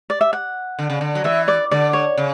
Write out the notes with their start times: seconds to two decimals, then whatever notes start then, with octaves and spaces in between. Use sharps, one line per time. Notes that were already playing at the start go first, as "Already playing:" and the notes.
0.10 D5
0.21 E5
0.33 F#5
0.79 D3
0.90 C#3
1.01 D3
1.15 F#3
1.24 E3 E5
1.48 D5
1.71 D3 D5
1.93 C#5
2.18 C#3